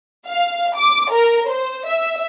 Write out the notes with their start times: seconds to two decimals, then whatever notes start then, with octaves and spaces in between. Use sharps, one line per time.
0.27 F5
0.77 D6
1.11 A#4
1.49 C5
1.86 E5